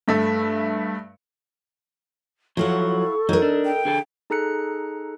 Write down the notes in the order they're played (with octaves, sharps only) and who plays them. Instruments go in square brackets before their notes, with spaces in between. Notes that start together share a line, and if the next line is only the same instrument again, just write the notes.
[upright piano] G2 A3 E5
[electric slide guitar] F3 F#3 [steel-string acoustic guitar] E4 F5 F#5 [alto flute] A4 [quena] C#6
[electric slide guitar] F#3 [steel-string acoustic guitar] D#4 A#4
[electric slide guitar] D4
[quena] G5
[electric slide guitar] D3 G#4 A4
[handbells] D#4 G#4 A4 A#5 F#6 C#7